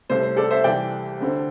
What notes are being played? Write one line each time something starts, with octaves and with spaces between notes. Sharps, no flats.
C2 C3 A3 C5
C5
A4 D5
C5 E5
C2 C3 E3 D5 G5
D2 D3 C4